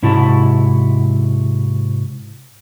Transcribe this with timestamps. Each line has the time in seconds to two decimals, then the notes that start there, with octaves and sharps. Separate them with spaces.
0.03 G#2 C3 E4 F#4 A5